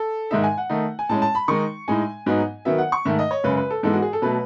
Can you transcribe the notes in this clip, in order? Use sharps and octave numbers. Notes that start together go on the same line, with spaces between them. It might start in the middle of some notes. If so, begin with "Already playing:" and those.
Already playing: A4
G#2 D#3 G#3 D#4 E5
G#5
F#5
D#3 A3 D#4
G#5
A2 G#3 C#4 A5
A5
B5
D#3 G#3 D#4 C#6
A2 G#3 D#4 G#5
G#2 F#3 B3 D#4
D#3 F#3 B3 E5
F#5
C#6
G#2 D#3 A3 E5
D#5
C#5
F#2 C#3 G#3 B4
B4
A4
G#2 E3 G#3 B3 A4
F#4
G#4
A4
B2 F#3 A3 B4